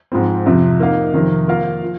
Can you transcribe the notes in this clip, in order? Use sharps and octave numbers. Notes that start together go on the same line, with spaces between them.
G#2 F3 C4
F2 C3 F3
A#3 D#4 A#4 F5
F2 C3 D#3
A#3 F4 A#4 F5
F3